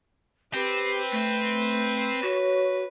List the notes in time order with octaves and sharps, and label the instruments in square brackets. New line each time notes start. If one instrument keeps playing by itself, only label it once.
[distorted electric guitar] C4 [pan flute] G4 [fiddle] B4
[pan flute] A3
[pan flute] F#4 [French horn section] C#5